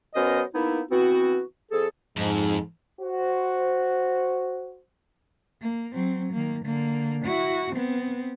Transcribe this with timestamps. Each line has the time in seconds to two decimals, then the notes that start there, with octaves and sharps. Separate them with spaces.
0.15 F#3 B3 C#4 A#4 C5 D#5
0.55 A#3 B3 D#4 E4
0.91 E3 B3 C4 F#4
1.72 F2 G#4 A4
2.17 F2 G#2
3.01 F#4 C5
5.61 A#3
5.93 F#3 C4
6.33 D#3 A#3
6.65 D3 A#3
7.25 E4 F#4
7.73 B3 C4